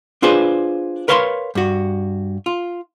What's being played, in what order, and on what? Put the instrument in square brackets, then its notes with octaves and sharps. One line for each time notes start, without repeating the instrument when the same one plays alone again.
[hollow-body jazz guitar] D4 F4 G#4 B4 C5
A#4 B4 C#5 F5 A5 C6
G2 F#4
F4